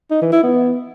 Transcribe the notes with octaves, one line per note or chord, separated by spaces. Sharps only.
D#4
E3
E4
B3